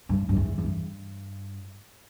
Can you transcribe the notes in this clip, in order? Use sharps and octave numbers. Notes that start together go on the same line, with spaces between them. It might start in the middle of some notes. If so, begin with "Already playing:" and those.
G2
G2
E2
E2
G2